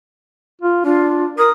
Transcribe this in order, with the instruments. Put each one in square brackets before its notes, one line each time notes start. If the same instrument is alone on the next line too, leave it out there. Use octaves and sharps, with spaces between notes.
[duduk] F4
[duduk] D4 [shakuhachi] F4
[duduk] A#4 [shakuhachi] D#6